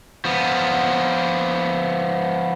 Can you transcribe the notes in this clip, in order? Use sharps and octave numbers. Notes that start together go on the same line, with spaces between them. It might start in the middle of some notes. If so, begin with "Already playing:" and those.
F3 B3